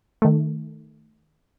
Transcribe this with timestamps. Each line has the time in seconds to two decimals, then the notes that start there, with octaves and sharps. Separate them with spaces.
0.22 D#3 A3